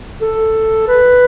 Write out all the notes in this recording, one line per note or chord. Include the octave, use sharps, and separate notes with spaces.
A4
B4